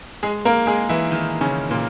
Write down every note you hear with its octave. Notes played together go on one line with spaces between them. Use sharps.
G#3 G#4
A#3 A#4
G#3 G#4
E3 E4
D#3 D#4
C#3 C#4
A#2 A#3